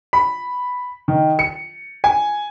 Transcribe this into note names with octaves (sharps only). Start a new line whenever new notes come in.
B5
D#3
C#7
G#5